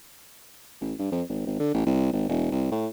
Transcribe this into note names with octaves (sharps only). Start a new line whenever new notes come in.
A1
G2
F2
G#1
G#1
D3
A1
C2
G#1
E1
C2
A2